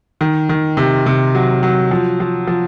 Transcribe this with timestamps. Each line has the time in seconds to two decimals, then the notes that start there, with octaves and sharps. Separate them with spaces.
0.21 D#3
0.49 D#3
0.77 C3
1.06 C3
1.35 F#3
1.63 F#3
1.91 F3
2.20 F3
2.47 F3